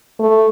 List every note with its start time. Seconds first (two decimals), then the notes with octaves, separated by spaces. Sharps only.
0.19 A3